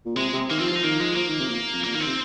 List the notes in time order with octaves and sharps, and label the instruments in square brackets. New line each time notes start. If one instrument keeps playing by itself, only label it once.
[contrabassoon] A#2
[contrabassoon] C3 [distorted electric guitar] G#3
[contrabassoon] C3
[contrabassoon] D#3 [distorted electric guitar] A#3
[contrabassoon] F3 [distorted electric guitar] C4
[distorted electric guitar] F4
[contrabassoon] F3
[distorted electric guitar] D#4
[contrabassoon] D#3 [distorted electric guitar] A#3
[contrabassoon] F3 [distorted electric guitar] G#3
[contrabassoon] F3 [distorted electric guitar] A#3
[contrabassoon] D#3
C3
A#2
F2
[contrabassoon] A#2 [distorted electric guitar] A#3
[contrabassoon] D#3 [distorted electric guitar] A#3
[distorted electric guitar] C4
[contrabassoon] C3